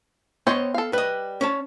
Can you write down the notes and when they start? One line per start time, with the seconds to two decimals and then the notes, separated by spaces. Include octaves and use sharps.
0.47 B3 C5 C#5 D#5 G5
0.74 A4 F5
0.93 G3 B4 D#5
1.41 C#4 C#5 A5